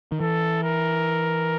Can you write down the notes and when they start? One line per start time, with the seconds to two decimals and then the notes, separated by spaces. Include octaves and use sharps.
0.12 D#3
0.20 E3 A4
0.63 A#4